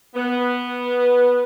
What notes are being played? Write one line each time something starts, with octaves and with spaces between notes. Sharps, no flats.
B3